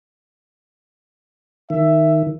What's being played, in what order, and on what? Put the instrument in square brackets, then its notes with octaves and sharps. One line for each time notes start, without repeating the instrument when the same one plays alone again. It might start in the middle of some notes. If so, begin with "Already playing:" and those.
[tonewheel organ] D#3 [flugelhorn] E5